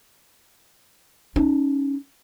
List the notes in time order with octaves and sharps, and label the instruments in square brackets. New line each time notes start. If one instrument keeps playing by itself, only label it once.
[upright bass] C#4 D#4